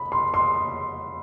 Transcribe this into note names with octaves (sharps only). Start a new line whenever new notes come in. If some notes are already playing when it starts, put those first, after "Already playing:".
Already playing: B5
C6
C6